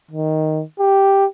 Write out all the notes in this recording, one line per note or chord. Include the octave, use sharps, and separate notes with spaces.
D#3
G4